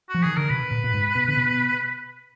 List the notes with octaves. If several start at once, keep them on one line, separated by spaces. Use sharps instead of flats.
F#4
F3
D#3 G#4
D3 A#4
B2 B4
A#2
A#2
G#2
B2
D3
B2